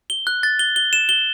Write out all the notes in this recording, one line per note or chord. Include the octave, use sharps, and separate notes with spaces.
G7
F#6
A6
G7
G7
E7
G7